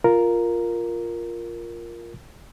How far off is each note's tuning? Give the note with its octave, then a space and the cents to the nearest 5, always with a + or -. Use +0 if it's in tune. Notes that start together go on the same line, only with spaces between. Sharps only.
F4 +0 A#4 +0